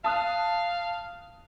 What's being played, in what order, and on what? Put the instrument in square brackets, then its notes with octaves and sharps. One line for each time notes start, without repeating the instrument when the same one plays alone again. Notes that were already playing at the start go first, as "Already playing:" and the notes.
[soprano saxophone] F5 [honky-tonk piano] A5 D#6 F#6